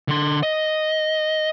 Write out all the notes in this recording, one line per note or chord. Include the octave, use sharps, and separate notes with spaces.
D3 C6
D#5